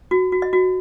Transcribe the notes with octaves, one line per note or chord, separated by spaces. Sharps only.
F#4
F#4
D#5
F#4